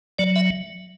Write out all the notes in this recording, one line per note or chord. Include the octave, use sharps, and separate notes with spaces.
F#3 D5
E5